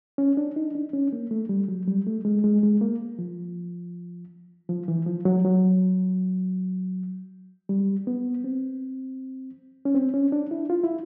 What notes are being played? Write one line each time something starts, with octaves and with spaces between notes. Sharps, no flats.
C#4
D4
D#4
D4
C#4
A#3
A3
G3
F#3
G3
A3
G#3
G#3
G#3
A#3
F3
F3
E3
F3
F#3
F#3
G3
B3
C4
C#4
C4
C#4
D4
E4
F4
E4